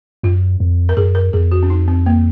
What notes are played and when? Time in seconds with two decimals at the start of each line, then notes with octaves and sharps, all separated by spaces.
0.23 F#2 F4
0.60 F2
0.89 A#4
0.97 F#2 G#4
1.15 A#4
1.33 F2 G#4
1.52 F#4
1.63 C#4
1.70 D#4
1.88 C4
2.06 A#3